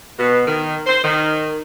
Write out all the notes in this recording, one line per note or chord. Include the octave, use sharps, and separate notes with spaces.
B2
D#3
C5
D#3